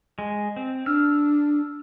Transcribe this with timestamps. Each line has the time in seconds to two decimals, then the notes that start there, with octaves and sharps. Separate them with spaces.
0.19 G#3
0.56 C4
0.86 D4 E6 F6